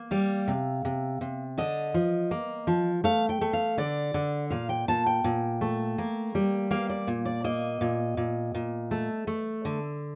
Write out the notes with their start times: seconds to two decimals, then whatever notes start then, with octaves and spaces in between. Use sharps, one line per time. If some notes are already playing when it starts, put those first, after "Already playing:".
Already playing: A#3
0.11 G3 F5
0.48 C3
0.85 C3
1.21 C3
1.58 D3 D#5
1.94 F3
2.31 A#3
2.67 F3
3.04 A3 F5
3.29 G5
3.41 A3
3.53 F5
3.78 D3 D5
4.14 D3
4.50 A#2 F5
4.69 G5
4.88 A#2 A5
5.06 G5
5.24 A#2
5.61 A3
5.98 A#3
6.35 G3
6.71 A#3 F5
6.90 D5
7.07 A#2
7.25 D5
7.44 A#3 D#5
7.81 A#2
8.17 A#2
8.54 A#2
8.91 A3
9.27 A3
9.65 D3